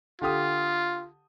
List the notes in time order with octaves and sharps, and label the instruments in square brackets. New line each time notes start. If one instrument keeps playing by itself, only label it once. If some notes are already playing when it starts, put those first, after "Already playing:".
[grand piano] D3 G4 D#6 [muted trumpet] F4